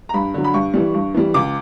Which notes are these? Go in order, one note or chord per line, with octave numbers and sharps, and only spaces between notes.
A#5
G2 B5
D3 F#3
B5
G2 C#6
E3 G3
G2
E3 G3
C#2 D6